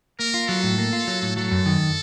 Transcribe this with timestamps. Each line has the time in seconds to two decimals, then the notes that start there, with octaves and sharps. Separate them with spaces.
0.19 A#3 A#4
0.34 F4
0.48 F#3 A4
0.63 A2
0.78 A#3
0.93 F4
1.08 F#3
1.22 A2
1.36 F#3 A4
1.51 F#2
1.66 D#3